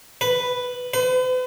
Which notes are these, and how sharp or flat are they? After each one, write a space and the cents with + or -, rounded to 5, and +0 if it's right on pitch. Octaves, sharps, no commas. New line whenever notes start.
B4 +5
B4 +45